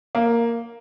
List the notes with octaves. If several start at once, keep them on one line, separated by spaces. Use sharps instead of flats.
A#3